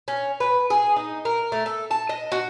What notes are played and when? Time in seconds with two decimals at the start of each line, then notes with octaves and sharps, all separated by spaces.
0.08 C#4
0.40 B4
0.70 G#4
0.96 D#4
1.25 A#4
1.52 A3
1.66 A4
1.91 A5
2.09 D#5
2.32 F#4